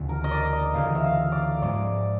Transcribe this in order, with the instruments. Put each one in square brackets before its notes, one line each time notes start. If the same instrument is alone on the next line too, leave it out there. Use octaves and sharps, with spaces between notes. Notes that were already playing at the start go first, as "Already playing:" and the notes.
Already playing: [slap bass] D2 C#3 E3
[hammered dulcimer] A#4
D#5
D5
D#5
[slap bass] D2 C#3 E3 [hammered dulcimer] F5
[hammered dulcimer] E5
F5
D5
[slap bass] G#2 F3 G#3 [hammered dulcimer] D5